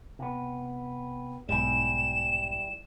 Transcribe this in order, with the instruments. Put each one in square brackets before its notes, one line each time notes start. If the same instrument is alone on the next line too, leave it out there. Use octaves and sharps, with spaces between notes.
[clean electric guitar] C3 B3
[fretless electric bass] B1 G#2 [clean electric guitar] G3 E4 G#5 [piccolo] E7